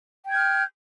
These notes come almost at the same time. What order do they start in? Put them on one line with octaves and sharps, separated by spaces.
G5 G#6 G6 F6